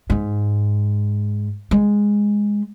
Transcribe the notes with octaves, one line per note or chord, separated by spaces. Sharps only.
G#2
G#3